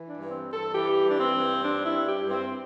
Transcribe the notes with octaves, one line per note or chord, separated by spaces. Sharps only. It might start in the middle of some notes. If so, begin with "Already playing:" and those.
Already playing: E3
D4
G2
C4
G2
A4
E3 G4
G2
D4
C4
G2
G3 D4
E4
G2
G4
G2
C4